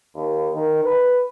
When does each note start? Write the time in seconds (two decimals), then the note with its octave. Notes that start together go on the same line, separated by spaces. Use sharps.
0.16 D#2
0.54 D#3
0.84 B4